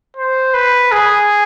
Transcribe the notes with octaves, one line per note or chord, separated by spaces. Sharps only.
C5
B4
G#4